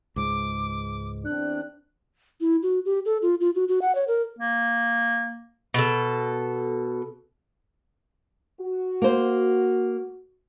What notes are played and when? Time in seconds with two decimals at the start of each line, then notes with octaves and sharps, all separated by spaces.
0.16 C#2 G#2 D6
1.25 E2 C4 D4 F#6
2.41 E4
2.63 F#4
2.85 G4
3.05 A4
3.22 F4
3.41 F4
3.55 F#4
3.68 F#4
3.82 F#5
3.95 C#5
4.08 A#4
4.39 A#3
5.74 B2 A4
8.60 F#4
9.02 A#3 C5